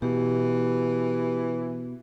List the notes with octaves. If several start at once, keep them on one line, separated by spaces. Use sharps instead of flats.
B2 E3 G4